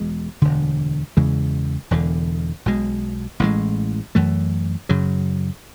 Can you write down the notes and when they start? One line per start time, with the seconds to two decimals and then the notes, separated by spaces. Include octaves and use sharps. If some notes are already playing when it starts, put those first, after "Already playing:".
Already playing: E1 E2 B2 G#3
0.42 E1 D2 D3
1.17 E2 C#3 E3 G#3
1.91 E1 E2 D3
2.66 B1 B2 G#3
3.40 A1 A2 E3 G#3
4.15 F#2 E3 A3
4.89 F#2 C#3 F#3